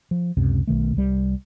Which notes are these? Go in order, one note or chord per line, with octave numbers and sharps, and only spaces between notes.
F3
C#2 F#2 C3
B1 B2 D#3 A3
C2 G3